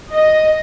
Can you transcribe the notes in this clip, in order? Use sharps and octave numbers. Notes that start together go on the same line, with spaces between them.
D#5